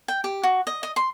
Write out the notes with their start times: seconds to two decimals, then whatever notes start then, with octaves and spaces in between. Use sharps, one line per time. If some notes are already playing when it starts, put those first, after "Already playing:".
0.08 G5
0.24 G4
0.43 F#4
0.67 D#5
0.83 D#5
0.96 C6